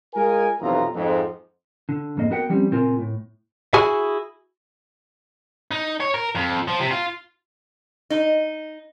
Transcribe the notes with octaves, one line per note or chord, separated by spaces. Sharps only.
G#3 F4 A#4 G#5
B1 F2 C3 E3 F4 A#5
F2 G#2
D3
F2 G#2 A#3 D#5
B3 F#4 A#4 F#5 G5
F3 G3 C4 C#4
C#2 A#2 C4 F4 A#4 G#5
A2
E4 F#4 G#4 G#5
D#4
C#5
A#4
F2
F3
C3
F4
D#4